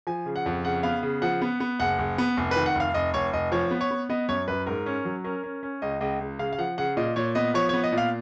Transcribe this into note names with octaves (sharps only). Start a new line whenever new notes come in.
F3 G#5
C#3
F#5
F2
C#3 F#5
B3 F5
C#3
F3 F#5
B3
B3
F#1 F#5
F#1
B3
F1
D#3 B4
F#5
F1 F5
F1 D#5
F1 C#5
F1 D#5
F3 C#5
B3
C#5
B3
B3 D#5
F#2 C#5
F#2 B4
G#2 A#4
C#4
F#3
C#4 A#4
C#4
C#4
C#2 D#5
C#2 D#5
C#2
C#3 F5
F5
F3 F#5
C#3 F#5
A#2 D#5
A#2 C#5
B3 D#5
F3 C#5
B3 C#5
D#5
A#2
F5